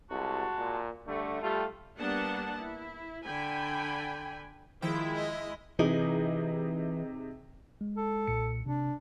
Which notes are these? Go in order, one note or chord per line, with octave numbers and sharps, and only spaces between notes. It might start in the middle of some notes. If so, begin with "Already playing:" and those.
C2 G#3 F#4 A5
A#2
D3 G3 A3
G3 A3 F4
G3 A#3 B3 D4 F#5 A5
E4
D3 G5 G#5 B5
D#3 F3 G#3 E4 G5
D#5
C3 E3 D#4 G#4
G#3
A4
B1 A#2 C#7
C3 D4